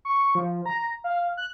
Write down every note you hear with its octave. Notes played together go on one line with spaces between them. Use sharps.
C#6
F3
A#5
F5
F#6